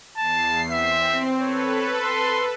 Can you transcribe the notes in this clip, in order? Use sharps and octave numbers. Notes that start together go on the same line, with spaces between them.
E2 A5 C7
C4 E5
A4 B4 C#5
C6